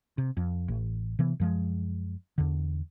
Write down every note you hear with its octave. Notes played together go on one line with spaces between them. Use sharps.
C3
F2
A1
C3 E3 B3
F#2 F3 G#3
E2 D3